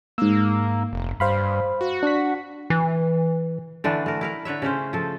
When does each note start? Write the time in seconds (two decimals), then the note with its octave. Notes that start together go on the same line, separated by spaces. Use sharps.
0.18 G#2 A#3 E6
0.93 F1
1.20 G2 C5 F5 B5
1.81 F#4
2.03 D4 B6
2.70 E3
3.84 D3 E3 A3 D4
4.06 A3 A#4
4.21 E4 A#4 F5
4.45 D3 B4 C#5 E5
4.62 C#3 A3 C#4 C5
4.93 F3 A4